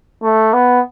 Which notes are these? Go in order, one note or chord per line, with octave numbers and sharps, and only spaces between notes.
A3
B3